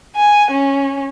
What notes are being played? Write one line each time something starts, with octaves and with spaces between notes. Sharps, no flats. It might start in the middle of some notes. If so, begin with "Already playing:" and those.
G#5
C#4